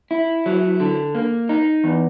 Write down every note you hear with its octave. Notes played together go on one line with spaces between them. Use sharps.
E4
F#3
D3
A#3
D#4
E2